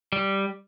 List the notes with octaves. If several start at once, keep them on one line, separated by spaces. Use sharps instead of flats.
G3